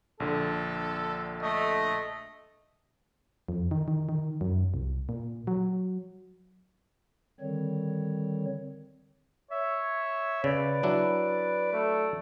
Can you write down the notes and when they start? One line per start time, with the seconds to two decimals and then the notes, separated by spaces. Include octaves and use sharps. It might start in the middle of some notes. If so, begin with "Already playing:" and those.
0.20 A#1 D3 A4
1.42 A3 D#5
3.49 F2
3.71 D#3
3.88 D#3
4.09 D#3
4.41 F#2
4.74 C2
5.09 A#2
5.47 F#3
7.40 D3 D#3 G3 C4 C#5
9.51 C#5 E5
10.44 C#3 B4 D5
10.83 F#3 D4 E4
11.73 A3